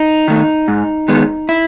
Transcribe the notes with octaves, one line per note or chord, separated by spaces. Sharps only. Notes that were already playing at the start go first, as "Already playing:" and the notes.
Already playing: D#4
D#3 A3
G#2
D#3 G#3 B3
E4